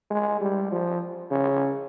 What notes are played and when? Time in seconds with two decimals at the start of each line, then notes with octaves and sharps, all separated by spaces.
0.11 G#3
0.41 G3
0.72 F3
1.31 C#3